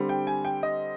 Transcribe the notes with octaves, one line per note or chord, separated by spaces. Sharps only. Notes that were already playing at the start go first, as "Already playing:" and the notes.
Already playing: D3 G3 C4
G5
G#5
G5
D#5